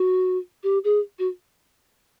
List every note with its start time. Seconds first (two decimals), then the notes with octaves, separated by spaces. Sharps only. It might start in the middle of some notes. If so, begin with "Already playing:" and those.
Already playing: F#4
0.63 G4
0.84 G#4
1.19 F#4